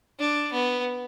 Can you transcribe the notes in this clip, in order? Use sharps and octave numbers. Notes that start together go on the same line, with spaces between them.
D4
B3